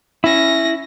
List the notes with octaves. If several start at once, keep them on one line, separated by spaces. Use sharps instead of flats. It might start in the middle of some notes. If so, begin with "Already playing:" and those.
C#4 E4 A#6